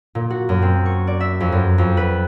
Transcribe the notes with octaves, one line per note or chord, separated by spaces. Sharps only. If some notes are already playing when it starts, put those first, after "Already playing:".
A#2
F#4
F#2
C4
C#6
D5
E5
F2
F#2
F2
B4